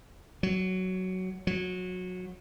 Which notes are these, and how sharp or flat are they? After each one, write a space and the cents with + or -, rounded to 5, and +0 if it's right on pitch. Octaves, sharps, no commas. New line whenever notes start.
F#3 +10
F#3 -20